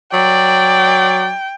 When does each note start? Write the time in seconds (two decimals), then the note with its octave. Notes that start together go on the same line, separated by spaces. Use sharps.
0.13 F#3 D5 G5